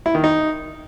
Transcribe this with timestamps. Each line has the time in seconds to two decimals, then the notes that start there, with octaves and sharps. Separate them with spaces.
0.06 E4
0.15 D#3
0.24 D#4